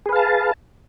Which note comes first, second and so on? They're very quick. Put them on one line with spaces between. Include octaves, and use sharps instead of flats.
G#4 B4 F5 A5